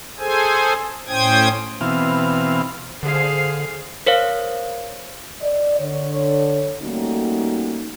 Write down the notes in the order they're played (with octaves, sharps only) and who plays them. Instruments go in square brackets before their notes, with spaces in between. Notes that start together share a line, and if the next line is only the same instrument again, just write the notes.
[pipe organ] G#4 A4 C5 G#5
A2 C#4 C5 G5 D#6 G#6
[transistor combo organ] B2 E3 C4 F5
[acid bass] D3 [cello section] G#4 C5 F5
[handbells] A#4 C5 C#5 F5
[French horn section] D5 D#5
D3 C#5
G3 A3 A#3 C#4 D#4 F#4